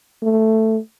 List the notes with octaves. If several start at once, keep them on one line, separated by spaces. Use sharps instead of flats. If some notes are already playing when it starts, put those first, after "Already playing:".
A3